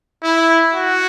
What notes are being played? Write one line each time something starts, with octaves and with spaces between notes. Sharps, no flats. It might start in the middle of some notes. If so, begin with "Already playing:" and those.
E4
F#4